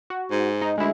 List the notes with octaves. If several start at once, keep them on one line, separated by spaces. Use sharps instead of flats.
F#4
G#2
D#4
D2 G#3 E4